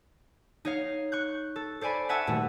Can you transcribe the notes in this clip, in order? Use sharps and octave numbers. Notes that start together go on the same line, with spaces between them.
D#4 C#5 F5
C#6 F#6 G6
A4
A4 C5 D5 G#5 B5
E5 F#5 G#5 A5 C#6 E6
D#1 A3 F#4